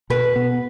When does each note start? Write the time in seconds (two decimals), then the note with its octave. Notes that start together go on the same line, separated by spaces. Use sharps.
0.10 B2 B4
0.36 B3